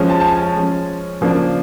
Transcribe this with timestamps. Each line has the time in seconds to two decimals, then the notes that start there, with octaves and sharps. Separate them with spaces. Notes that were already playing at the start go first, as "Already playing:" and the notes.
Already playing: F3 G#3 C#4
0.10 A5
0.20 A5
0.26 G#5
0.42 A5
0.57 F3 G#3 C#4
1.21 C#3 F3 A#3 D4